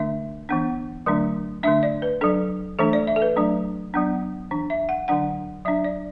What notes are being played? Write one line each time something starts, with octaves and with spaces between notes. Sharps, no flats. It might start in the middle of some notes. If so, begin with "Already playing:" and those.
Already playing: D3 A3 D4 E5
E3 B3 D4
D3 F#3 A3 D4
D3 A3 D4 E5
D5
B4
F#3 D4 A4
E3 A3 D4 A4
D5
E5
A4
B4
F#3 A3 D4
F#3 B3 D4
E3 D4
E5
F#5
D3 F#3 D4 F#5
F#3 D4 E5
D5